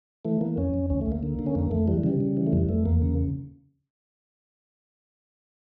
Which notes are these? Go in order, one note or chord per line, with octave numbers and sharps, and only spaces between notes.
E3 A3
E3 A#3
F2 C#4
F2
D2 C#4
A3
D2
A#3
D3
D3
C#4
F2 A#3
F2 A3
E3 G3
C#3 G3
C#3
E3
A3
F2 G3
F2 A3
E2 A#3
C#3